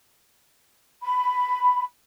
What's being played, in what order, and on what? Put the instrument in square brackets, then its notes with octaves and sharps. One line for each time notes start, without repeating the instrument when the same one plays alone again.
[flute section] B5